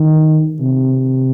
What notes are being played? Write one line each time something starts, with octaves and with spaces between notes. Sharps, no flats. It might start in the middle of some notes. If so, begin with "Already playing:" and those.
Already playing: D#3
C3